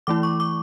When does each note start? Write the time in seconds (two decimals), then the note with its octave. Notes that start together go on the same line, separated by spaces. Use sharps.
0.07 E3 A3 E4 D6
0.23 C#6
0.40 D6